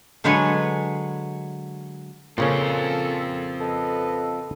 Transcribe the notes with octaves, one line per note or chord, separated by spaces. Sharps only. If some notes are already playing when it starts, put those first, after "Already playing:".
D3 F#3 G#3 B4 C#5 G#5
A#2 C#3 C4 C#4 F4 A4
A4 B4 D#5